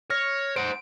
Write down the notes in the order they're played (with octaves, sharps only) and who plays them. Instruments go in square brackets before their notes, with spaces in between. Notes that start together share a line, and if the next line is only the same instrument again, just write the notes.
[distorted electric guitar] C#5 [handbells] F6 A#6
[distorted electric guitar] C5 F#5 [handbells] D7